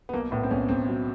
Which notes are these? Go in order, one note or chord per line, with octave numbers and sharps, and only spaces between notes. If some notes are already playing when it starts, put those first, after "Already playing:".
B3
B1 A#3
A2 B3
C4
B1 C#4
B1 C4
F#3